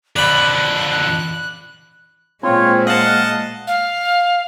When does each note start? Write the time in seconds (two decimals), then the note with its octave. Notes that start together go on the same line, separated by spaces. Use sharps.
0.16 F2 D3 D5 B5 F#6
2.43 A#2 G#3 C4 F4 C#5
2.87 D#5 F5 F#5 A5
3.67 F5